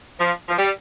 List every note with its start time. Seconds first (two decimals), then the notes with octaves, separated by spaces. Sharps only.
0.19 F3
0.48 F3
0.58 G3